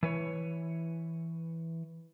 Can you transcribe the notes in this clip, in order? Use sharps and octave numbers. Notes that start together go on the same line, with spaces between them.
E3 B4 C#5